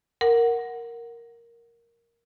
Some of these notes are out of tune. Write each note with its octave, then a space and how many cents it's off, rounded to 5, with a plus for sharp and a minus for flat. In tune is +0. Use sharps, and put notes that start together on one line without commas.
A#4 +0 F#5 +0